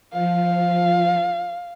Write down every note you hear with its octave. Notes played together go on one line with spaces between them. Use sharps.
F3 F5